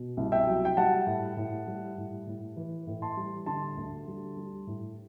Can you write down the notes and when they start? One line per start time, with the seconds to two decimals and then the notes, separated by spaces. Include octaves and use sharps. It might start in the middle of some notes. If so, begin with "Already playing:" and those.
Already playing: B2
0.17 C2
0.32 E5 G5
0.47 F#3
0.65 G5
0.77 G3 F#5 A5
1.07 A2
1.37 A2
1.67 G3
1.98 A2
2.27 A2
2.57 E3
2.87 A2
3.02 A5 C6
3.17 G3
3.46 D3 A5 C6
3.77 D2
4.07 G3
4.37 G3
4.67 A2